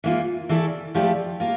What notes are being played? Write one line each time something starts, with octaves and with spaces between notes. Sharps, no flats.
E3 A#3 F4
E3 A3 E4 A4 D5
F3 A3 E4 G4 D5
A#3 F4